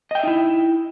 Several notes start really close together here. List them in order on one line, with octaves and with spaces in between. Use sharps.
D#5 G5 E5 D#4 E4